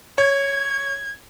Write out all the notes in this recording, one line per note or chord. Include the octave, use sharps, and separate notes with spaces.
C#5 G#6